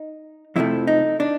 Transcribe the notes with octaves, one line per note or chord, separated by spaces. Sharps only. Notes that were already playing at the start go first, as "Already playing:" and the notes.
Already playing: D#4
F2 C3 F3 A3 E4
D#4
D4